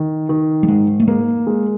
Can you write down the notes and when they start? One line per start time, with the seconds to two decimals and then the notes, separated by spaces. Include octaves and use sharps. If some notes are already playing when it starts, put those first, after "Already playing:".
Already playing: D#3
0.29 D#3
0.63 G3
0.68 G#2 G#3
1.00 A3
1.08 G#3 A#3
1.47 G#3